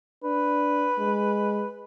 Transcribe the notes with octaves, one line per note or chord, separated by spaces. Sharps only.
D4 B4
G#3